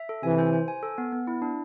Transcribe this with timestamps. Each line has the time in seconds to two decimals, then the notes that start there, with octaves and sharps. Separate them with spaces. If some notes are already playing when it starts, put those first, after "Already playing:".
Already playing: E5
0.09 A4
0.23 C3 E3 G#5
0.38 C5
0.53 C5
0.68 G#5
0.83 A4
0.98 B3
1.12 B3
1.27 E4
1.42 D4